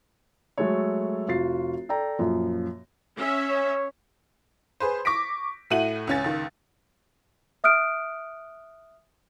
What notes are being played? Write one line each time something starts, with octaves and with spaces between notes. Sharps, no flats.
F#3 G#3 A3 A4 C#5
F1 F4 F#4 A6 C7
A4 D5 G5 A#5
F#2 A#2 F3
C#4 E5
C#5
G#4 B4 C5
C#6 D6 A#6 B6 D7
A2 A3 F#4 D#7 F#7
C#2 C#4 A6
C#2 D#3
E5 D#6 F6 F#6 D7